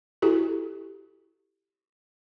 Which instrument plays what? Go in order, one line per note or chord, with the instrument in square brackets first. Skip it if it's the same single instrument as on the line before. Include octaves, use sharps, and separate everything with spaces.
[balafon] E4 F#4 G4 A4